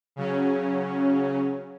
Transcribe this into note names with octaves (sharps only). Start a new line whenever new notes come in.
C#3 F#3 C#4